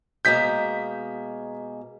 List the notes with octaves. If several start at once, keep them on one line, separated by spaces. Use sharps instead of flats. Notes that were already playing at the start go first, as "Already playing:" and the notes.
B2 G#3 A#3 G6 B6